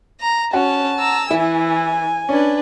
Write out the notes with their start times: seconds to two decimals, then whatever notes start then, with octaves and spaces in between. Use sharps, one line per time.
0.20 A#5
0.53 C#4 F#4 A5
0.98 A#5 E6
1.31 E3 E4 G#5
2.29 C#4 D4 B4